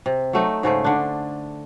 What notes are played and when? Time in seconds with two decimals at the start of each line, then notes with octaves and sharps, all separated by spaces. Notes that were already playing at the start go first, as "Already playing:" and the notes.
0.06 C3
0.33 F#3 A3 D#4
0.63 G#2 C#3 A3 C5
0.84 D3 D4